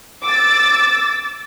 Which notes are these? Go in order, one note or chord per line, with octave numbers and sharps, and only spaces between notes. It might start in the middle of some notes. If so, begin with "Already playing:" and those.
D6 E6 A6